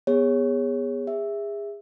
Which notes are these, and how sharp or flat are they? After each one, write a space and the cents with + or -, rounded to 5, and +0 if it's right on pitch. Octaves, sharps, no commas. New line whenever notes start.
B3 +0 G#4 -25 C#5 +0
G#4 -30 E5 +0